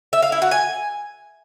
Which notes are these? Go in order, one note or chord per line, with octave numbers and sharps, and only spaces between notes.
E5
F5
E4
F#4
G#5